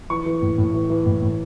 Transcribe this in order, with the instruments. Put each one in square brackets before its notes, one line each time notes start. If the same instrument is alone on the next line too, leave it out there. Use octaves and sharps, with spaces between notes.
[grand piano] E3 C#6
E3
A2
A2
E3
E3
A2
A2